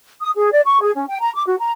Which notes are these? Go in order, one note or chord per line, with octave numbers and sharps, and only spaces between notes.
D#6
G#4
D5
C#6
G#4
C#4
G5
A#5
D6
F#4
A#5